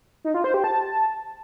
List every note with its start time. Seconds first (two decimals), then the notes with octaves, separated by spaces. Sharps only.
0.24 D#4
0.34 F4
0.44 C5
0.54 G4
0.64 A5